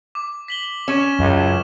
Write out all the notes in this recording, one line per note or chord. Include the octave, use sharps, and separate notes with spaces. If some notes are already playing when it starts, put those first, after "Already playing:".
D6
B6 F#7 G7
C#4 C#6 E7
C#2 F#2